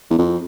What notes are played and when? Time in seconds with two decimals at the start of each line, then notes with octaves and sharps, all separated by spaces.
0.10 E2
0.18 F2